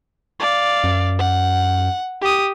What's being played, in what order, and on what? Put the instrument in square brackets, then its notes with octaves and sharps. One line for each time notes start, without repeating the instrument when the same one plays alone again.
[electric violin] D5 F5
[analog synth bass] F#2
[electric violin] F#5
G4 D#6